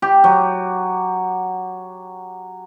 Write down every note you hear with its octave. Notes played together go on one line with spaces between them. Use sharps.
G4
F#3